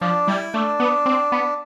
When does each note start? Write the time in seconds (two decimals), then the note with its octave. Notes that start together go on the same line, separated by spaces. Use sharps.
0.01 F3 D4
0.27 G3 E4
0.54 A3 D4
0.80 B3
1.06 C4
1.32 B3